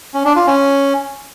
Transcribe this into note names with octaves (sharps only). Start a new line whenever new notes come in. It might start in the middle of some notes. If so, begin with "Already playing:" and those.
C#4
D4
F4
C#4